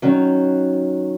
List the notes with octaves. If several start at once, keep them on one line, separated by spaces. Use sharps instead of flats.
D#3 F#3 C#4